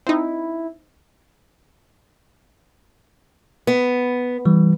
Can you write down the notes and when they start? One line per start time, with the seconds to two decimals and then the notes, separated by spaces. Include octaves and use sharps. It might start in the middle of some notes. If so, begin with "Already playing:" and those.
0.07 C4 D#4 E4
3.67 B3
4.46 E3 G3